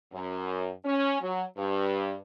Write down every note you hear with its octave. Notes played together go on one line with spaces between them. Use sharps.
F#2
C#4
F#3
G2